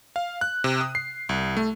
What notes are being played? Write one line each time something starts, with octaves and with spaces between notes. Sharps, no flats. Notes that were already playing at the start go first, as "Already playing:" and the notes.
F5
F#6
C3
D#6
C7
C2
A3